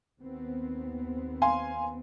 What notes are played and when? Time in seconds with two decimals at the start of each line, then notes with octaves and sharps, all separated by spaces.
0.19 D#2 B3 C4
1.42 F5 G#5 C6